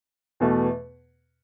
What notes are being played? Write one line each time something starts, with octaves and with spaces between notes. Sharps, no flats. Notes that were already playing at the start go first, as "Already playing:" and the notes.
E2 B2 A3